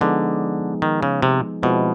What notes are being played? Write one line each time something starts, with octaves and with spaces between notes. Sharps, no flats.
D3 F3 G#3 B3 D#4 G#4
D#3
C#3
C3
B2 F3 G#3 C4 E4